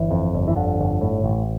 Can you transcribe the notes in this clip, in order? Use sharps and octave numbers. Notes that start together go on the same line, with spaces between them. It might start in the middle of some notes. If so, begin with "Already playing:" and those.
Already playing: G1 E3
F2
G1
E3
F2 D3
G1
A2
A1